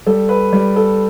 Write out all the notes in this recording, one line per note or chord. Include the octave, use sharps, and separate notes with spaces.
G3 A4
B4
G3
A4